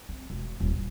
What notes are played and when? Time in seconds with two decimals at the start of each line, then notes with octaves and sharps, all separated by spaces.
0.09 C4
0.30 E1
0.60 D#1
0.73 A1